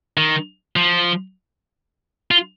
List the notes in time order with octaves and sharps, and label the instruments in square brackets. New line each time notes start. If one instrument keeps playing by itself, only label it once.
[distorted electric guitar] D#3
F3
F4